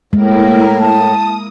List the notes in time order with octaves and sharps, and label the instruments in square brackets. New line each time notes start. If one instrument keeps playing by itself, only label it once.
[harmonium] A2 [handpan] G#3 [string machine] A#3 E4 A#4
[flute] A5 [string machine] D#6